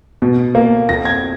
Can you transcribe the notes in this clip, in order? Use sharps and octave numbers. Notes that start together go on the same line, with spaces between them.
B2
A#3
F2 A#6
G#6